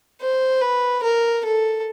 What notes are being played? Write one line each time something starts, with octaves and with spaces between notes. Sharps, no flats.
C5
B4
A#4
A4